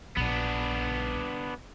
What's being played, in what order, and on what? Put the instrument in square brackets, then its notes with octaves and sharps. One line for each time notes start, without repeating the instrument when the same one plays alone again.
[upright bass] A#1 [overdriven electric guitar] B3 D4